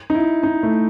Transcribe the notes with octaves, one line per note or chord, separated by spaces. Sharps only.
D#4
E4
D#4
A3